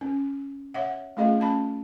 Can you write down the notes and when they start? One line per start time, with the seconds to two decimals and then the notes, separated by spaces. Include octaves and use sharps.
0.01 C#4
0.74 C#5 E5 F#5
1.17 A3 C#4 F4 G#4 D#5 F5
1.40 C#4 A5 B5